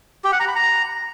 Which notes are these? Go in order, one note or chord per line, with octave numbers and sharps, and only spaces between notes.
G4
F#5
A#5
B5
A#5